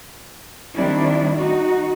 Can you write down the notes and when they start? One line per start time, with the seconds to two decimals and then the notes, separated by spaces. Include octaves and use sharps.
0.75 D#3 G3 C4 D4 E4
1.36 D#4 F#4